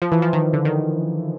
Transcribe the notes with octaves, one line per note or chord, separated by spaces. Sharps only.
F3
E3
F3
D#3
D3
D#3